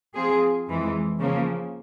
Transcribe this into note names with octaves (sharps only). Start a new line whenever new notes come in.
F3 C4 F4 G#4
F2 E3 G#3
C#3 F3 A#3 C#4